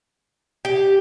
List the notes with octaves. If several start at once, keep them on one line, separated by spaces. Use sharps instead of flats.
G4